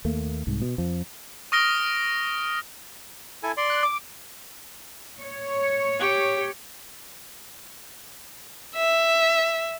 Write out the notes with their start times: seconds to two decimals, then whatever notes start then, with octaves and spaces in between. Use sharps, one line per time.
0.05 D#2 A3 A#3
0.47 C2 G#2
0.62 B2
0.78 F2 F3
1.52 C#6 D#6 F6 A#6 D7 G7
3.43 E4 A4 G#5
3.57 D5 C6
3.70 F#6
3.83 D6
5.20 C#5
6.00 G4
8.75 E5